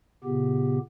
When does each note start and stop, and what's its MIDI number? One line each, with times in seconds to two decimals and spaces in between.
0.24 0.78 46
0.24 0.78 49
0.24 0.78 59
0.24 0.78 67